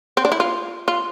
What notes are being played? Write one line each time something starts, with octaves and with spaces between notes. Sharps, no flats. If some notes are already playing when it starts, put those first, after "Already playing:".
C4
D4
E4
F4
F4